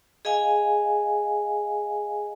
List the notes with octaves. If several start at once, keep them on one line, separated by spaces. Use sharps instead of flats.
G#4 D#5 F5 G#5